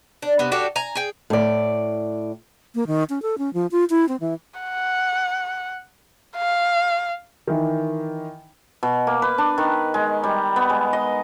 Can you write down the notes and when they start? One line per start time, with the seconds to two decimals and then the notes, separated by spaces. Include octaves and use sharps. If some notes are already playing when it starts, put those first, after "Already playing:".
0.22 D4
0.39 C3 B3
0.52 D4 F#4 G4 A4
0.76 G#5 A#5
0.95 G#4 G5
1.30 A2 D5
2.75 A#3
2.87 D#3
3.10 C#4
3.22 A4
3.38 C#4
3.54 F3
3.71 F4
3.90 E4
4.08 C4
4.20 E3
4.60 F#5
6.36 F5
7.47 D#3 E3
8.83 B2
9.07 A#3
9.22 B4
9.38 D4
9.58 D#3
9.94 G#3
10.23 G3
10.56 B3
10.70 G#3
10.93 D#5